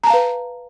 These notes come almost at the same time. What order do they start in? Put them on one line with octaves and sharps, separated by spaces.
A#5 A5 F5 B4